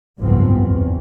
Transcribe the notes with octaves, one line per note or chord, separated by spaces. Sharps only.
F#1 C2 G#2 F3 B3 C4
E2